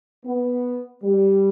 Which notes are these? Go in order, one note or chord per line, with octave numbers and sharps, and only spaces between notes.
B3
G3